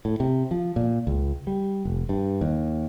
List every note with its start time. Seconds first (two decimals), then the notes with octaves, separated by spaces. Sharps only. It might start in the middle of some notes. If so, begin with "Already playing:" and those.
0.05 A2
0.20 C3
0.51 F3
0.76 A#2
1.07 C#2
1.47 G3
1.85 F1
2.09 G2
2.41 D#2